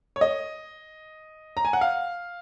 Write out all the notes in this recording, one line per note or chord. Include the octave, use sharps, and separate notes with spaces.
C#5
D#5
A#5
G#5
F#5
F5